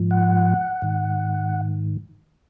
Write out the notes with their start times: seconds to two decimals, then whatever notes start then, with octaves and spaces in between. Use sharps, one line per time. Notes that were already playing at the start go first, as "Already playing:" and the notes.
Already playing: G#2 F3
0.11 F#5
0.82 G#2 D#3